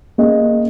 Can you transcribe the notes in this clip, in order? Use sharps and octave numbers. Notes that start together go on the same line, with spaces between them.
A#3 C#4 G#4 D#5